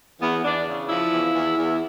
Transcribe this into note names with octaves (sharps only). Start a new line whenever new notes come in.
E2 B3
E2 D4
C#3
F3 E4
E2
E2
E2